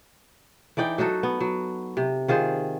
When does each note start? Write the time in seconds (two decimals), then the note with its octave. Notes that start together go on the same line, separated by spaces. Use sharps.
0.77 E3 D#4 D5 G5
0.98 F#3 D#4 F#4 A4
1.23 B3
1.40 F#3
1.97 C3
2.28 D#3 F4 G#4 C5